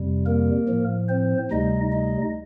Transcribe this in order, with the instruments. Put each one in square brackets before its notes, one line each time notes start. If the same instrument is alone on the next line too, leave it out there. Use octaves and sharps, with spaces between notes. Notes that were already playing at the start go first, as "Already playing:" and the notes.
Already playing: [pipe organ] F2 C3 G3
A#3 A#4
A2 F3
C4 C5
D2 C3 G3 D#4 D#5
D#4 D#5